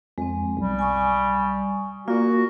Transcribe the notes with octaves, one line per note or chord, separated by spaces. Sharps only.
F2 G#3 C4
B1 G3
G#5 C#6 D#6
A#3 F4 F#4 D5